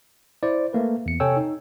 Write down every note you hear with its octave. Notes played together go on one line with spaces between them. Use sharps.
E4 C5 D5
A3 A#3 B4
E2 C#7
C3 A4 C#5 G5 G#5 E6
D#4